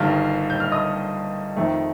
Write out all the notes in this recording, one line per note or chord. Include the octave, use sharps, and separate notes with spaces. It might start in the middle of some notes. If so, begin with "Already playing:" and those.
Already playing: G1 G2 D#3 F5 F6
G6
F6
D#5 D#6
F2 D#3 A3